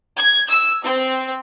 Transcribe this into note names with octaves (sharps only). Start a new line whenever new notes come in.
G#6
E6
C4